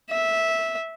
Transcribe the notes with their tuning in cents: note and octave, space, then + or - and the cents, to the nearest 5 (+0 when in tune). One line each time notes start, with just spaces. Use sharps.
E5 -10